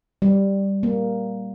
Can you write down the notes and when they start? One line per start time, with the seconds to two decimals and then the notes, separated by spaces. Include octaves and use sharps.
0.22 G3
0.83 A#3